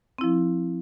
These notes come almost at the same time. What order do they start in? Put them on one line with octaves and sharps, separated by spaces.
C4 E4 F3